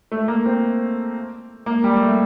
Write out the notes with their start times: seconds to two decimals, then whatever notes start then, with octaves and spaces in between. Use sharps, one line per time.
0.12 A3
0.28 A#3
0.46 C4
1.66 A#3
1.84 G3
2.01 A3